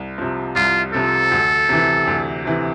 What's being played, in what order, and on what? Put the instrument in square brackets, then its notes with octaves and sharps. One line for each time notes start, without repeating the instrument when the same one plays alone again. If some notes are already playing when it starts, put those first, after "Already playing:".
Already playing: [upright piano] C2
C3 F3
[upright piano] C2 [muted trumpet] F4
[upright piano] C3 F3 [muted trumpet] A4
[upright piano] D2
C3 E3
D2
C3 E3